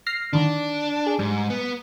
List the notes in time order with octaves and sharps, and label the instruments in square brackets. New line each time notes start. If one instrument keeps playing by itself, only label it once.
[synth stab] F6 A#6 C7
[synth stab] D3 D#3 [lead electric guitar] D4
[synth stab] G#4
[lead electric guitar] G#2 [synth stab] G3
[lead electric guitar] B3